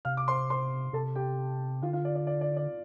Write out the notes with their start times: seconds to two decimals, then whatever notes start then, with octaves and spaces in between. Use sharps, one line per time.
0.05 C3 F5 F6
0.17 D6
0.28 C5 C6
0.50 C5 C6
0.93 C3 A4 A5
1.15 G4 G5
1.82 D3 F4 F5
1.93 F4 F5
2.05 D5
2.15 D5
2.27 D5
2.41 D5
2.57 D5